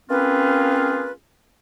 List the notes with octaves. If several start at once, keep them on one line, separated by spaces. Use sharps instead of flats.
A#3 C4 C#4 F4 G#4 B4